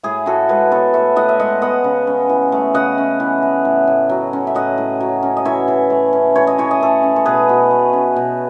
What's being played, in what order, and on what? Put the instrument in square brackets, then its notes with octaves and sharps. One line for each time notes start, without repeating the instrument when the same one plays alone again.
[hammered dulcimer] A2 E4 G#4
A2 F#4 A4
G#3 G#4 B4
B3 A4 C#5
A2 C#5 E5
A2 D#5 F#5
E5
G#3 D#5 F#5
B3 D#5 F#5
C#3
C#4
E3
A3
C#3 D#5 F#5
C#4
E3
A3
A2
A2
F#3
C#4
E5
A2 D#5 F#5
A2
F#3
C#4
D#5
E3 C#5 E5
E3
A3
C#4
E3 C#5
D#5
E3 C#5
D#5
A3 A4 C#5
C#4
C#5
B2 G#4 B4
B2
A3
C#4
B2